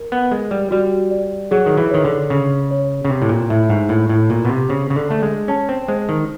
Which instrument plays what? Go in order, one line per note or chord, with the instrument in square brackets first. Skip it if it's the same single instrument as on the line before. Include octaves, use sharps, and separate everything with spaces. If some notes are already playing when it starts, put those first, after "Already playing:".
Already playing: [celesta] A#4
[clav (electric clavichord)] B3
[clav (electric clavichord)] G#3 [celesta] A#4
[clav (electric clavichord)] G3
[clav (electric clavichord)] G3 [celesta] F#4
[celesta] D5
[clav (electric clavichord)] F#3 [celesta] G#4
[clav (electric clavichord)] D#3
E3
[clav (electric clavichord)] D#3 [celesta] C#5
[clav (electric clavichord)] D3
[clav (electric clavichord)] C#3 [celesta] G#4
[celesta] C#5
[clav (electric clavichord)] C#3
[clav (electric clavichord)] C3 [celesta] G5
[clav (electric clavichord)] A2
A#2
[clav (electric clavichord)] A2 [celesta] E5
[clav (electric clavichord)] G#2
[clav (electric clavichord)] A2 [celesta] A#4
[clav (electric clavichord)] A2
[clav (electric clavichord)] A#2 [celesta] A#4
[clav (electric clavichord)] B2
C3
[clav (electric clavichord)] C#3 [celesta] C5
[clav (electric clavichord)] C#3
D3
[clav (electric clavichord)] A3 [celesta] A5
[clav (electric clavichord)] G#3
[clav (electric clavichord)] C#4 [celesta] A5
[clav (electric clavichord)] C4
[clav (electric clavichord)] G#3 [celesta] C5
[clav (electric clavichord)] D#3